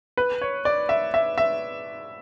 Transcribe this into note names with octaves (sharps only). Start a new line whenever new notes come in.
B4
C#5
D5
E5
E5
E5